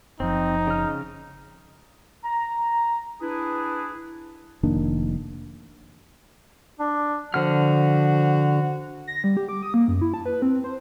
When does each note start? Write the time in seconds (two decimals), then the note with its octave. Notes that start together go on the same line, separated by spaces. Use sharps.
0.20 F#1 F3 C4 D#4
0.67 C#3 F6
2.24 A#5
3.21 D4 E4 G#4 B4
4.63 F1 D#3 A#3 D4
6.80 D4
7.34 D3 F3 F#4 F6
9.07 A#6
9.24 G3
9.37 G4
9.49 D6
9.62 D#6
9.74 A#3
9.88 F#2
10.02 E4
10.14 A5
10.26 B4
10.42 C4
10.64 C5